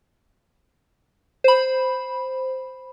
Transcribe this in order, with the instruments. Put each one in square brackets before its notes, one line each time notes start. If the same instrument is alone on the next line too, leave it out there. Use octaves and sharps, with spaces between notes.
[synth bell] C5 B5